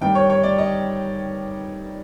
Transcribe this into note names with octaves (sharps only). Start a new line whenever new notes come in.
G2 D#3 G3 G5
C#5
C#5
D5
D#5